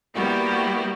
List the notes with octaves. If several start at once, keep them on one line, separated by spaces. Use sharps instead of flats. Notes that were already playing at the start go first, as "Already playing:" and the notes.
G3 A#3 B3 E4 F#4 G4